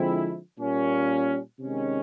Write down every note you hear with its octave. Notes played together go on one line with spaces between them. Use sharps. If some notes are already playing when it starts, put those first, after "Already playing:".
Already playing: D3 F3 G#3 C4 E4
A#2 G3 A#3 C#4
C3 D#3 G#3 C#4